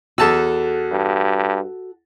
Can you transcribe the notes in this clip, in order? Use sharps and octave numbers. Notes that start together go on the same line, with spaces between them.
E2 F#4 A4 A5 E6
G2